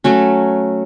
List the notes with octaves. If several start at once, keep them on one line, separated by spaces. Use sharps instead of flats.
F#3 A3 C#4 F#4